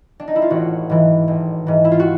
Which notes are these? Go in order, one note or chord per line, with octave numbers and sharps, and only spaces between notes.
D4
D#4
E4
F4
A1 F#4
G#2 E3
A1
G#2 E3
E4
F4
F#4